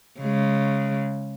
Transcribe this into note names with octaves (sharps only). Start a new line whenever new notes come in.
C#3 G#3